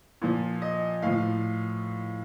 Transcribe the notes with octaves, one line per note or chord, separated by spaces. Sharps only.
A#2 F3
D#5
A2 F3 F5